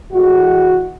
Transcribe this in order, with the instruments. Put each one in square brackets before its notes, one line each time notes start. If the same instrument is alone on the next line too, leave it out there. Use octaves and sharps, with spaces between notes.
[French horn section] A2 E3 G#3 F#4